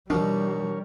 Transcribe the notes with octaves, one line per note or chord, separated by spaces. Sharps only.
B2 D#3 E3 G3 D4 A#4 C#5